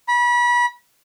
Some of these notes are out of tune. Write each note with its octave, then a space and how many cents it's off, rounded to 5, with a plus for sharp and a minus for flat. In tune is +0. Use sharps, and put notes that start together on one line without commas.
B5 -30